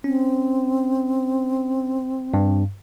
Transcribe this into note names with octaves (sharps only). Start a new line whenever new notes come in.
C4 C#4
G2